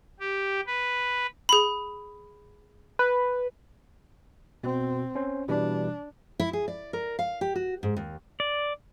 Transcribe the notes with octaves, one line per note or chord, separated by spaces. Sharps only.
G4
B4
G#4 B5
B4
B2 C4
C#4 C5
B2 E3 G3 D4
E4
G#4
D5
A#4
F5
G4
F#4
G#2
D#2
D5